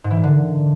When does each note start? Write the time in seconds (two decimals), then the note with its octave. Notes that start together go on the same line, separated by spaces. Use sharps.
0.04 G#2
0.11 E3
0.17 A#2
0.23 D3